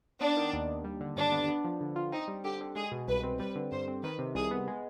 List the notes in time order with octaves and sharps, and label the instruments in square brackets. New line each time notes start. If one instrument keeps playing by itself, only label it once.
[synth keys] B3 [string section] D4
[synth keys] D#3
D#2
D#2
G3
D3
[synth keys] G2 [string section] D4
[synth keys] B3
B3
F3
D3
F4
[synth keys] C4 [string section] D#4
[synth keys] G3
[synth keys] D3 [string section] G4
[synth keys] D3
[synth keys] G#3 [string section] G#4
[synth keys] B2
[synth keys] C2 [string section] B4
[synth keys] C4
[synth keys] G3 [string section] B4
[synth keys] D3
[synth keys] G2 [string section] C5
[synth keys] C4
[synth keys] D#3 [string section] B4
[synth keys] C3
[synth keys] C2 [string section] G#4
[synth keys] B3
G#3